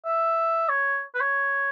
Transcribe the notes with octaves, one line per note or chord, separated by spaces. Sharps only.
E5
C#5
B4
C#5